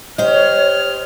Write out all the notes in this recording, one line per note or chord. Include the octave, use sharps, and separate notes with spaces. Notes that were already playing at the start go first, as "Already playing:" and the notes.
G4 C5 C#5 D#5 F6